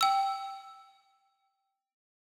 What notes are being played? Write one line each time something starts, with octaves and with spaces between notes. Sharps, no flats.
G5 E6